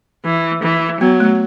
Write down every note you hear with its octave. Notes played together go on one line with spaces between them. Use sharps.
E3
E3
F#3 B3
A3